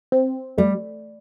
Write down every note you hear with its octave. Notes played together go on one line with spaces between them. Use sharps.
C4
G3 A3